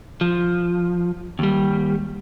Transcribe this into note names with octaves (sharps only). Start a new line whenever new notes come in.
F3
D#2 G3